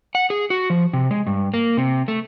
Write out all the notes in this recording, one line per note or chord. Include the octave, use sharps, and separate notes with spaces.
F#5
G#4
F#4
F3
C3
G#3
G2
A#3
C3
A3